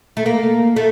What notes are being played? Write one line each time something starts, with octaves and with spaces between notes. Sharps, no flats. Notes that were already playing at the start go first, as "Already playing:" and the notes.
A3
A#3
A3